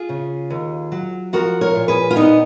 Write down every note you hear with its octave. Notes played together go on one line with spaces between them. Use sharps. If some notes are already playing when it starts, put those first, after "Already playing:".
Already playing: F4 G#4
C#3
D#2
F#3
F3 F#4 A#4
A#4 C#5
A#2
G#4 B4
F4
A#2 B3 D#4